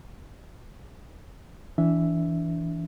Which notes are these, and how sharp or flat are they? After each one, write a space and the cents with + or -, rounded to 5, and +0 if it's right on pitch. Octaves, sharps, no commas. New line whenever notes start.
E3 +0 D4 -30 E5 +0